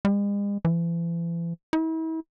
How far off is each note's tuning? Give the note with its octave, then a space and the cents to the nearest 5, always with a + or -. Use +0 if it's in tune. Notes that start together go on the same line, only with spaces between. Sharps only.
G#3 -45
E3 +40
E4 -40